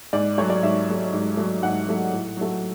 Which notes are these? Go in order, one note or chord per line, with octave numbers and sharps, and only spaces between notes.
G#2 D5
F#3 A3 C#5
D5
G#2 E5
F#3 A3
G#2
F#3 A3
G#2 F#5
F#3 A3
A2
F#3 A3